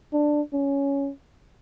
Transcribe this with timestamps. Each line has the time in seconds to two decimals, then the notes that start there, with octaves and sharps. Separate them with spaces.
0.13 D4
0.53 C#4